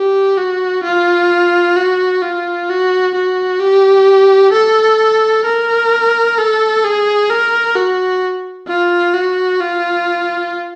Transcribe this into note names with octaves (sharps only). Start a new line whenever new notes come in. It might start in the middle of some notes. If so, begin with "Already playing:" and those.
Already playing: G4
F#4
F4
F#4
F4
F#4
F#4
G4
A4
A#4
A4
G#4
A#4
F#4
F4
F#4
F4